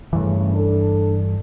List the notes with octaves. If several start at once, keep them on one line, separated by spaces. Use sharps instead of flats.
G2 C#3 E3 A3
D4 A4